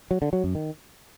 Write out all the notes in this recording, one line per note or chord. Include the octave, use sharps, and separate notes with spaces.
F#3
D3
F#3
F#2
D#3